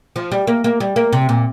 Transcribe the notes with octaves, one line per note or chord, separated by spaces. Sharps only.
F3
G3
A#3
A#3
G3
A#3
C3
A#2